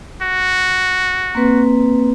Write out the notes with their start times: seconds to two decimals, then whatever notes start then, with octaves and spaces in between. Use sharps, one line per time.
0.23 F#4
1.35 A#3 C4 B4